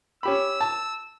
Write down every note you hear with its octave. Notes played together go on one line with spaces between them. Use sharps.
C#4 G4 B5 E6
A5